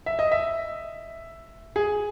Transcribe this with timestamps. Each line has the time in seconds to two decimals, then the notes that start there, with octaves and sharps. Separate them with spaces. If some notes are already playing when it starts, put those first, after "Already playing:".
0.06 E5
0.19 D#5
0.31 E5
1.76 G#4